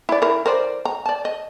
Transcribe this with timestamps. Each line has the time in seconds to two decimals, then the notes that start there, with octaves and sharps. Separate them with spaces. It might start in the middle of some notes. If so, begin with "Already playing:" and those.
0.09 E4 D5
0.22 E4 A#4
0.46 A#4 C5 D5
0.85 A#5
1.06 D5 A5
1.25 D#5